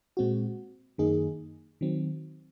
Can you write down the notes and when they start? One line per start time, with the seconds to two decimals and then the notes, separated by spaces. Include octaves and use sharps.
0.17 A#2 G#3 C4 F#4
0.98 F#2 D#3 A#3 D#4 G#4
1.81 D#3 F#3 C4